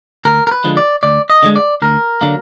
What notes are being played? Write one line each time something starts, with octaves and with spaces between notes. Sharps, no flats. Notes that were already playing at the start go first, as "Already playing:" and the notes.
D2 A#4
A#4
B4
D3 F3 G#3
D5
D2 D5
D#5
D3 F3 G#3
D5
D2 A#4
D3 F#3 A#3